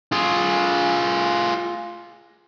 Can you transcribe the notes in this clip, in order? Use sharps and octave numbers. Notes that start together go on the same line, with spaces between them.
F4 G#4